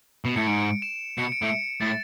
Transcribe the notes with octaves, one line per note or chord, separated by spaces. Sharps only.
B2
A2 C#7
G#2 D7
E7
B2 C#7
D7
A2
C#7
A2 A6